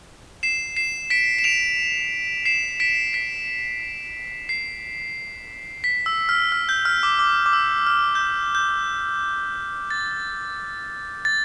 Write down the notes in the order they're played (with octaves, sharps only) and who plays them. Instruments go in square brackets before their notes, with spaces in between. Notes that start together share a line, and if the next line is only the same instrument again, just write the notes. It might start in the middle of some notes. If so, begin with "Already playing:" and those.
[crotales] C7 E7
C7 E7
B6 D7
E7
D7 F7
C7 E7
B6 D7
B6 D7
C7
B6
E6
F6
F6
G6
F6
D6
D6
D6
E6
F6
G6
F6
G6
A6
A6